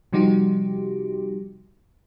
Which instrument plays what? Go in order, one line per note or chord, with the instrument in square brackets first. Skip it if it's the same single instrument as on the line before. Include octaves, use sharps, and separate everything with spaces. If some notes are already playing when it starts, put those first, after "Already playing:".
[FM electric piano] C3 F3 G3 D#4 F#4 G4